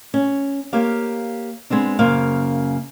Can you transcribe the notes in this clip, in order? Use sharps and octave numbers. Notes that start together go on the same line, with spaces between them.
C#4
A#3 G4 C5 C#5 F5
G#3 B3 C4 D4
F#2 C#3 A#3 C5 F5